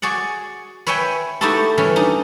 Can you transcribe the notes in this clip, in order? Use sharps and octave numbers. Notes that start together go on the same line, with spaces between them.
F#4 G#4 D5 F#5
B4 C#5 E5 G5 G#5 B5
A3 D#4 E4 F#4 G4 A4
E3 G3 C#4
D4 D#4